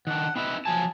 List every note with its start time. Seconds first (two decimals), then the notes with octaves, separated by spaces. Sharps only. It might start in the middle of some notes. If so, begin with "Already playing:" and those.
0.07 D#3 D4 F#5
0.36 C4 D#4 B4 E5
0.65 F3 F#3 G#5 A5